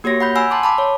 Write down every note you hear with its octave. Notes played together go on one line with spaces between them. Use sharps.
A#3 F#4 G4 C#5 A#6
F#5 B5 G6
F#5 G#5 B5 E6
A5 C6 D6 E6
A5 B5 D6
C#5